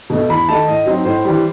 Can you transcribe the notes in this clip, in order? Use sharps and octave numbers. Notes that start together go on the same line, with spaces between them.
B2 A3
E2 B5
D#3 A3 D#4 A5
A2 D#5
F#3 C4 D#4
A2 C5
E3 G3